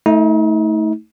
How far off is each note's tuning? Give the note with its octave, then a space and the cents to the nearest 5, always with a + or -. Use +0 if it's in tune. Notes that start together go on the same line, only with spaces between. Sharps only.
A3 +0 D#4 +40